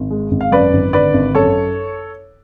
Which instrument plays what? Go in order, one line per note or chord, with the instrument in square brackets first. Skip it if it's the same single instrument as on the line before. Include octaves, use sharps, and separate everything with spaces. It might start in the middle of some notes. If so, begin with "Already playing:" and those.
Already playing: [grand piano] G#1
G#3
G#1
F5
F#2 B4 D5
G#1
D3 B4 D5
G#1
F#2 A4 C#5